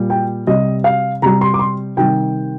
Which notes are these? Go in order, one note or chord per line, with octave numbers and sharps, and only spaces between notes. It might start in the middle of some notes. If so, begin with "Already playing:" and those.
Already playing: A#2 G3
G5
C3 G3 D#5
F5
C3 G3 A#5
C6
D6
C6
C3 D#3 G3 G5